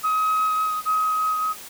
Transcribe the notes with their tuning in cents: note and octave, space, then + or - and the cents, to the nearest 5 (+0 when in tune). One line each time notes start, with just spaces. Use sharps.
D#6 +30
D#6 +25